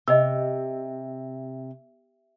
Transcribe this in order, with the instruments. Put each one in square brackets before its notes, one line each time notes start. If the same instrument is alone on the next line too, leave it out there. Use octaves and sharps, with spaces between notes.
[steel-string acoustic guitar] C3 [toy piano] D#5 E6